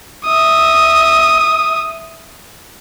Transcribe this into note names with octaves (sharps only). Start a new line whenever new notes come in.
E5 D#6